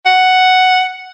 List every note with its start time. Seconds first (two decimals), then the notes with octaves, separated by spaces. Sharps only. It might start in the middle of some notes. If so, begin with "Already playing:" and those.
0.06 F#5